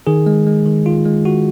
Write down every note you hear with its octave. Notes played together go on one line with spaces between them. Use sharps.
D#3 G#4
G#3
G#3
D#3
D#3 F4
G#3
D#3 F#4